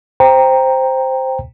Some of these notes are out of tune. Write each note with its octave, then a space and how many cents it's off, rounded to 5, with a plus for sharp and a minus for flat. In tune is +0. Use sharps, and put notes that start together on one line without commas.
C5 +0 G5 +10 A#5 +0